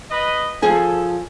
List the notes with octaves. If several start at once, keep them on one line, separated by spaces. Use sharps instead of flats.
B4 D#5
F3 G#4 A4 G#5